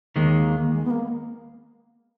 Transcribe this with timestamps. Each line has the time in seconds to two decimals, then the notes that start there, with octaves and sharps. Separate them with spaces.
0.16 D#2 D#3 G#3 A#3
0.72 G#3
0.85 B3
0.90 A#3